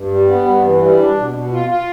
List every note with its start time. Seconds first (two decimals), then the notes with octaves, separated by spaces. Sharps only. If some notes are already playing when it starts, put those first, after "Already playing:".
Already playing: G2
0.11 G3
0.28 B3
0.46 G2
0.64 E3
0.82 G3
0.99 D4
1.17 B2
1.34 B2
1.52 F4
1.69 F4